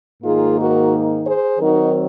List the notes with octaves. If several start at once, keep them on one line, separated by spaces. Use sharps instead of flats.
G#2 D#3 A#3 D#4 F4 G#4
F#4 A#4
G#4 C5
D#3 F#3 C4 D#4 F#4 A#4